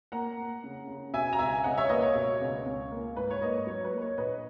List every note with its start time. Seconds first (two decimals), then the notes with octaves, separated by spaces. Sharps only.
0.12 A#3 F#5 A#5
0.37 A#3
0.64 C#3
0.88 C#3
1.14 B2 E5 G#5
1.33 A#5
1.39 C#2 E5 G#5
1.64 C#2 D#5 F#5
1.77 C#5 E5
1.89 A#3 B4 D#5
2.02 C#5
2.15 B2
2.41 C#2
2.65 C#2
2.91 A#3
3.16 G#2 B4
3.31 C#5
3.41 A#3 B4 D#5
3.67 F#3 C#5
3.84 B4
3.93 A#3
4.02 C#5
4.17 A#1 B4 D#5